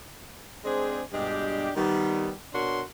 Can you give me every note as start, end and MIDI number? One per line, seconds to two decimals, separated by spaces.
0.65 1.01 56
0.65 1.01 60
0.65 1.01 62
0.65 1.01 68
0.65 1.01 72
1.12 1.70 43
1.12 1.70 47
1.12 1.70 56
1.12 1.70 62
1.12 1.70 67
1.76 2.31 51
1.76 2.31 55
1.76 2.31 59
2.54 2.82 47
2.54 2.82 62
2.54 2.82 66
2.54 2.82 70
2.54 2.82 73
2.54 2.82 84